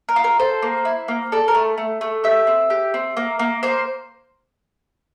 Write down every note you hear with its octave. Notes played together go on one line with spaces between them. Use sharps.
A#4
F4
A#4
A4 C5
A#3
E4
A#3
A4 D5
A#4
A3
A3
A3
G4 E5
C4
G4
C4
A#3
A#3
A#3 C5